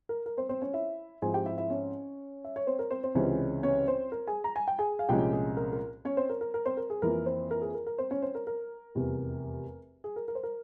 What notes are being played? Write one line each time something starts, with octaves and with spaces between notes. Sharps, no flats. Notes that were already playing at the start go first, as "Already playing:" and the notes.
A#4
A#4
C4 C5
C4 C5
C#4 C#5
E4 E5
G#2 F3 C4 E4 G#4 G#5
G4 G5
E4 E5
E4 E5
C#4 C#5
E5
C#5
C4 C5
A#4
C4 C5
C4 C5
C#2 C3 E3 G#3 C4 C#4 C#5
C#4 C#5
C4 C5
A#4
G#4 G#5
A#5
G#5
G5
G#4 G#5
F5
C2 A#2 F3 G#3 C#4 G4 G5
G#4
A#4
A#4
C#4 C#5
C4 C5
A#4
A#4
A#4
C4 C5
A#4
G#4
F2 E3 A#3 A#4
C4 C5
A#4
G#4
A#4
A#4
C4 C5
C#4 C#5
C4 C5
A#4
A#4
F1 E2 C3 G3
G#4
A#4
A#4
C5
A#4